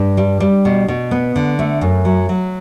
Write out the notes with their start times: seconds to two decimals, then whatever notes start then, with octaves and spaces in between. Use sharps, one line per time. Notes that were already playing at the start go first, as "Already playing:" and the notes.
Already playing: G2
0.17 G3
0.40 G3
0.65 B2
0.88 B2
1.11 B3
1.36 D3
1.59 A3
1.81 F#2
2.05 F#3
2.29 F#3